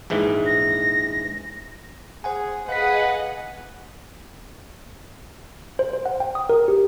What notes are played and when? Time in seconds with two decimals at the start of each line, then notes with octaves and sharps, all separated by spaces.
0.10 A#1 G#2 E3
0.46 A#6
2.24 G#4 C5 F#5 G#5
2.69 G#4 B4 D#5 F5 F#5 B6
5.79 C5
5.93 C5
6.05 F#5
6.20 G5
6.35 D#6
6.49 A#4
6.68 G4